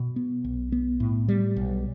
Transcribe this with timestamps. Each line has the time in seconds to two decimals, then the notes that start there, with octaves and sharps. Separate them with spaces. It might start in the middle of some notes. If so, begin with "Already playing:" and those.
Already playing: B2
0.16 B3
0.44 B1
0.72 B3
1.00 A2
1.28 G3
1.56 B1